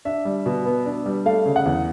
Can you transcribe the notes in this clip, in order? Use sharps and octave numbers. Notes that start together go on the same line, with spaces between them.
D4 E5
G3
B2
B3
D4
G3
A3 F5
C#3
F#5
E2